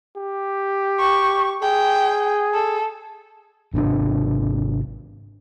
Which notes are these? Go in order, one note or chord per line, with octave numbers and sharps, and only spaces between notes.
G4
C#6
G#4 G5
A4
G#1 C3 C4 D4